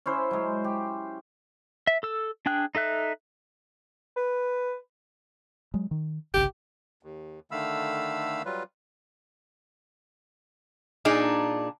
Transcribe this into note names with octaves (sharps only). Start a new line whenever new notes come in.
C#4 E4 C5
F#3 G#3
G4
E5
A4 E6
D4 G#4 G5 F#6
D#4 A4 E5 F#6
B4
F#3 G#3
D#3
G1 C2 C#3 G4
D#2
D3 D#3 A3 F5 B5 E6
F#3 G3 F4 B4
A#2 D4 D#4 G#4